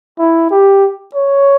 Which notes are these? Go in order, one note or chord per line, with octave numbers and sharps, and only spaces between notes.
E4
G4
C#5